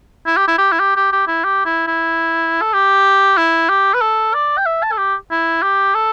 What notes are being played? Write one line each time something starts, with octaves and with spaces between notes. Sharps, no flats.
E4
G4
E4
G4
E4
G4
G4
G4
E4
G4
E4
E4
A4
G4
E4
G4
B4
A4
D5
G5
E5
A5
A4
G4
E4
G4
A4